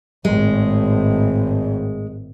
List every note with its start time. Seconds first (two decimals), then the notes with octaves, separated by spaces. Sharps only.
0.25 G#1 A2 G#3